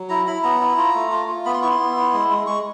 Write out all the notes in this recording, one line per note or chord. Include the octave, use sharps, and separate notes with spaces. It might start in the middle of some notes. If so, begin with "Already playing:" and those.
Already playing: F#3
E4 A#5
E4 B5
B3 A#5
E4
F4
A3
F4
F4
B3 B5
C6
E4 C#6
C6
B3
E4
G#3
G#3
G#3 C#6